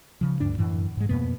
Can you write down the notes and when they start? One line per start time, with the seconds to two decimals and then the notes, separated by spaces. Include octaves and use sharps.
0.21 C#3 F3
0.40 D2 G2 D4
0.58 F#2 A2 E3
0.97 G#2 G#3
1.09 F2 B2 A#3 B3